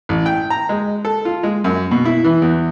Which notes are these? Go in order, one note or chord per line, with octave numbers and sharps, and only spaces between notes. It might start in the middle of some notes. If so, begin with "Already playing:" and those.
A1
G5
A#5
G#3
A4
F4
G#3
F#2
B2
E4
E3
E2